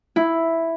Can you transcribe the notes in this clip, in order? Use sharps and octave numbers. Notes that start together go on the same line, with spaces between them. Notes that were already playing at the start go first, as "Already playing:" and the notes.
E4